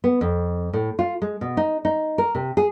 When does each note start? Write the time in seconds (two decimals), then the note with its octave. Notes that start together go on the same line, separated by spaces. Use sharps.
0.04 B3
0.21 F2
0.73 A2
0.99 F4
1.22 G#3
1.41 B2
1.57 D#4
1.85 D#4
2.18 A#4
2.35 C3
2.57 G#4